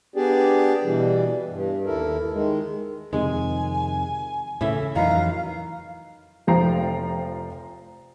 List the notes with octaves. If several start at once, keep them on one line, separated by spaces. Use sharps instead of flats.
B3 D4 G4 G#4 D5
B2 E3 G3
G2
D#2 E4 A4 A#4
D#3 G#3
F2 C3 D#3 G#3 G#5
A2 C#3 E3 A3 C#4 E5
F2 D#3 E3 F#3 A#4 B4 F5 A#5
F1 F3 G5 A#5 C7